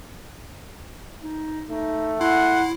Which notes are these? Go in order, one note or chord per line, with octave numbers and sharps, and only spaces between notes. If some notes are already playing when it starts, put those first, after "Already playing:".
D#4
A3 D#4
E4 F#5 C6